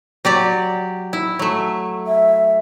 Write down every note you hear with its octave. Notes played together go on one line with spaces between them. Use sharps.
F#3 G4 D5
E4
F#3 A3
E5